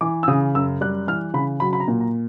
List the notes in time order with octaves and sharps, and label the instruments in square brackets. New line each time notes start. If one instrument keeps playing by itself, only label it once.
[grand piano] E3 D6
E6
C#3 D#6
F#2 E6
G3 F#6
E3 F6
C#3 B5
F#3 B5
B5
A#5
A#2
A#5